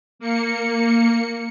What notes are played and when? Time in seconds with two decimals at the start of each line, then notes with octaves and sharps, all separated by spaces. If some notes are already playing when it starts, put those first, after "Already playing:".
0.19 A#3 C#7